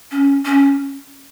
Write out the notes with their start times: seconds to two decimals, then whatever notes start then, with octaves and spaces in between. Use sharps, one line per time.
0.11 C#4
0.45 C#4